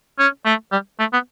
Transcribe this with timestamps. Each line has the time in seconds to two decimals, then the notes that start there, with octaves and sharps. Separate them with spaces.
0.19 C#4
0.45 A3
0.72 G3
1.00 A3
1.13 B3